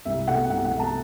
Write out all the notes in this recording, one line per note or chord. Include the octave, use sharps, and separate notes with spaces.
C2 E5
B2 A3 F#5
C2 F#5
F#5
B2 A3
A5